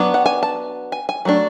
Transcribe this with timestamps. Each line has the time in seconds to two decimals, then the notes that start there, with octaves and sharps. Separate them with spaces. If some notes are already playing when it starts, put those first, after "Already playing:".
Already playing: F#3 B3 D4
0.14 F#5
0.26 G#5
0.43 A5
0.92 G#5
1.09 G#5
1.25 F#3 A3 D4